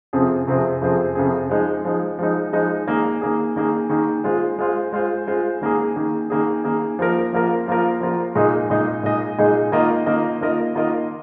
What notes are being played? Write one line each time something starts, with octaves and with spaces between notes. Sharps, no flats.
F2 C3 F3 C4 G#4
F2 C3 F3 C4 G#4
F2 C3 F3 C4 G#4
F2 C3 F3 C4 G#4
F3 G#3 D#4
F3 G#3 D#4
F3 G#3 D#4
F3 G#3 D#4
D#3 A#3 G#4
D#3 A#3 G#4
D#3 A#3 G#4
D#3 A#3 G#4
G#3 F4 C5
G#3 F4 C5
G#3 F4 C5
G#3 F4 C5
D#3 A#3 G#4
D#3 A#3 G#4
D#3 A#3 G#4
D#3 A#3 G#4
F3 A#3 F4 A#4
F3 A#3 F4 A#4
F3 A#3 F4 A#4
F3 A#3 F4 A#4
A#2 G#3 D#4 G#4 D#5
A#2 G#3 D#4 G#4 D#5
A#2 G#3 D#4 G#4 D#5
A#2 G#3 D#4 G#4 D#5
D#3 A#3 F4 A#4 D#5
D#3 A#3 F4 A#4 D#5
D#3 A#3 F4 A#4 D#5
D#3 A#3 F4 A#4 D#5